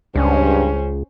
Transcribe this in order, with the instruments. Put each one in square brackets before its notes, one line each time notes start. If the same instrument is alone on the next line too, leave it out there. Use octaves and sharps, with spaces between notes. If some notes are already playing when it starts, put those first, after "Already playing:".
[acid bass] C#2 [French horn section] G2 [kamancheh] C#4 C5